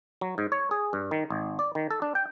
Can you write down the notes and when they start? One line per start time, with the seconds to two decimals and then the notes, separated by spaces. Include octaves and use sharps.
0.21 F#3
0.38 G#2
0.52 C#5
0.71 G#4
0.93 G2
1.11 D#3
1.30 G#1
1.59 D5
1.75 D#3
1.91 A4
2.02 D4
2.15 G5